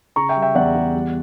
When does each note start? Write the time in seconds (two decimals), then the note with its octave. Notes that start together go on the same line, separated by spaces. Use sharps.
0.16 C#3 A#5 C#6
0.29 E5 G5
0.36 G3
0.42 E5 G5
0.55 E2 D5 F#5
0.75 E2
0.94 G3